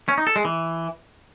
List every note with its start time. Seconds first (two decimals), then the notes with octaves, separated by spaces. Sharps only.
0.09 C#4
0.18 D#4
0.27 A4
0.36 G#3
0.45 E3